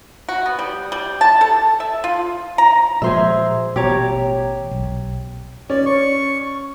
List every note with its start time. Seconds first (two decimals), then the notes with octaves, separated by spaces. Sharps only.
0.29 F#4
0.46 B3
0.59 G3
0.92 G3
1.21 A5
1.41 A4
1.80 E5
2.04 F4
2.58 A#5
3.02 A#2 F3 G#3 G#4 C5 E5
3.76 A1 B2 G4 C#5 A#5
4.71 B1
5.70 C#4 D5
5.86 C#6